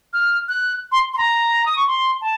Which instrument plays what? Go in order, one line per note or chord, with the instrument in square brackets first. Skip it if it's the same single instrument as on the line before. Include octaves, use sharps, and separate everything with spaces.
[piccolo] F6
F#6
C6
C6
A#5
D#6
C#6
C6
A5